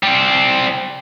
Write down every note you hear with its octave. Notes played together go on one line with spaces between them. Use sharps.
G3 C4